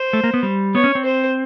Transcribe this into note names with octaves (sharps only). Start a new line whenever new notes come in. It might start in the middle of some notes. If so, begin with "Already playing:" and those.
Already playing: C5
A3
A#3
B3
G3
B3 C#5
C#4
C4
C5